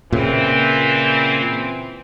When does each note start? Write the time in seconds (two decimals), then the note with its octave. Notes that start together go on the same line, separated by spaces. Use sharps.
0.12 A#2 C#3 E3 C4